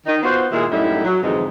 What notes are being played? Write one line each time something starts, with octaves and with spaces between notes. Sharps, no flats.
D#3 D#4
B3 F4 F#4 C5
D#2 A#2 G#3 E4 G#4
F#2 A2 G3 D#4 E4 E5
F#3
F2 G#2 D3 E3 G#3 D#4